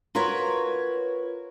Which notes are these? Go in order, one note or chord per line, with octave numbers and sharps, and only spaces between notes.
F4 F#4 A#4 B4 C#5